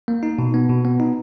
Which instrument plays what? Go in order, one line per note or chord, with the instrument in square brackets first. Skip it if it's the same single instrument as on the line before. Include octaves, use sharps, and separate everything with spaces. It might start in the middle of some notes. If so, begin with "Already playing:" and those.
[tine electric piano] A#3
D#4
B2
B3
B2
B3
D#4